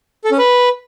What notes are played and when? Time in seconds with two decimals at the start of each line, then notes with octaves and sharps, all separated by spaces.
0.24 A4
0.31 C#4
0.38 B4